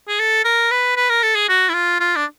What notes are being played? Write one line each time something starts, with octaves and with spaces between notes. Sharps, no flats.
G#4
A4
A#4
B4
B4
A#4
A4
G#4
F#4
E4
F4
F4
D4